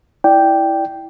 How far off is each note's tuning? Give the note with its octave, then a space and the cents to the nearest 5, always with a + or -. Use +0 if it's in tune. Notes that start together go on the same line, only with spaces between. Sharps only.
E4 +0 D5 +0 G5 +0